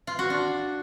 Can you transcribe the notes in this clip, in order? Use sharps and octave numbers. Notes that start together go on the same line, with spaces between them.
F4
F#4
D4